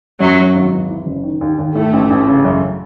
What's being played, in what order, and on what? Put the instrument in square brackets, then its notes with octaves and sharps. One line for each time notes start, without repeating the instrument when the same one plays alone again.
[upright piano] F#2 [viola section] F#3
[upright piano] F#3
G#1
E2
E3
F#1
D#3
D#2
D#2
[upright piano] A2 [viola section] A3
[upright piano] A1
A1
C#3
F#2